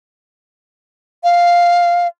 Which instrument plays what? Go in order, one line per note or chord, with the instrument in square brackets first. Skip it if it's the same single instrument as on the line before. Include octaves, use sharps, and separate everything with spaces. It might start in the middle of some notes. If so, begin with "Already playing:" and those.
[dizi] F5